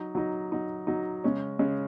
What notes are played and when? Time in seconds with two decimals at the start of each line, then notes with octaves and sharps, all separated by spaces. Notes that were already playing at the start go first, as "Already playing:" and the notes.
Already playing: F#3 D#4
0.15 F#3 D#4
0.52 F#3 D#4
0.87 F#3 D#4
1.24 C#3 G#3 C#4
1.59 C#3 G#3 C#4